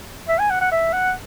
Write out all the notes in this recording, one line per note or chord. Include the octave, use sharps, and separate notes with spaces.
E5
G#5
F#5
F#5
E5
F#5